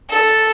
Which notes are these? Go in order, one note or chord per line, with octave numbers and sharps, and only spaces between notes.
A4